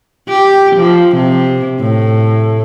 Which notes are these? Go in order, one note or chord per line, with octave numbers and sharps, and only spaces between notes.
G4
F3
C3
A2